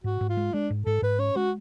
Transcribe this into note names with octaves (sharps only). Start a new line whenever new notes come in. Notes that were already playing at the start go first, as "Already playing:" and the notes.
G#2 F#4
G#2
F4
G#3
G#3 D4
G#2
G#2 A4
G#2 B4
C#4 C#5
G#3 F#4